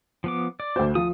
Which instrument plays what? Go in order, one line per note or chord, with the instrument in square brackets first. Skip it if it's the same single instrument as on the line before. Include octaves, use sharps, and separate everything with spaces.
[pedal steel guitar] F3 B3 D6
D5
[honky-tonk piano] D2 C5
[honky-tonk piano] F3 [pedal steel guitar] D#6